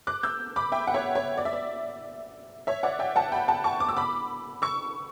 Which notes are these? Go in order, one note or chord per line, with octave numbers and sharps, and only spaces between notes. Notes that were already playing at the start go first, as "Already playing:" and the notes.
D6 F#6
E6 G6
B5 D6
E5 G5
F#5
C#5 E5
C#5
D5
E5
D5
C#5 E5
D5 F#5
E5 G5
F#5 A5
G5 B5
F#5 A5
A5 C#6
D6
E6
B5 D6
C#6 E6